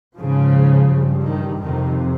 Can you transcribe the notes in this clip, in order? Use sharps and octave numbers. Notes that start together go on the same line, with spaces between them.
G#2 C#3 F3
G2
D#3
F2 C3 D#3